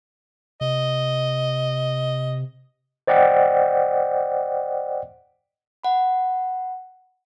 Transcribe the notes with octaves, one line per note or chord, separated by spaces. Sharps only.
C3 D#5
C5 D5 D#5 F#5 G5
F#5 B5